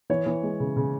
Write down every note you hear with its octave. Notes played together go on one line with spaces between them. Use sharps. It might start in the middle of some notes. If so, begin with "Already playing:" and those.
E3 C#5
E3
G#3
C#3
C#3